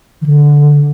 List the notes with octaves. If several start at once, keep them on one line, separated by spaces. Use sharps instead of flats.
D#3
D3